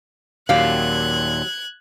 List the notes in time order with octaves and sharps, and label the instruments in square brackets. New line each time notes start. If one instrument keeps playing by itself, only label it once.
[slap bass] D#2 A#2 [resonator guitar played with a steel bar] F#3 G4 F5 [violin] F#6 G#6